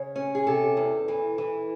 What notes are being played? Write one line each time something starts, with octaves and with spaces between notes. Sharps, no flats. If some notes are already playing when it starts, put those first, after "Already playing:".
Already playing: C#3 C#5
C#4
G#4
C3 A4
E2
E3
E3